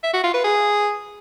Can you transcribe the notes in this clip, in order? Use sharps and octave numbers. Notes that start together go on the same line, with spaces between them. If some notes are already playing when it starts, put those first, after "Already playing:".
E5
F#4
F4
B4
G#4